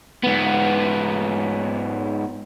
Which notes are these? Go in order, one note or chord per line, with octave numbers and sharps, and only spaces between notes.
G#2 B3